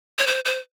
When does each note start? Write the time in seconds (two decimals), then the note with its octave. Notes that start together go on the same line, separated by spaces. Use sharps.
0.18 C#5
0.27 C5
0.45 C5